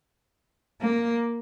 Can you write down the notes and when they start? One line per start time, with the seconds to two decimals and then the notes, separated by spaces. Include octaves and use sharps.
0.80 A#3